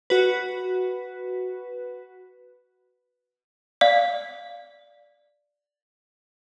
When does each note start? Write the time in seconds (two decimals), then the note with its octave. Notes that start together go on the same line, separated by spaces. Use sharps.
0.10 F#4 B4
3.81 D5 F5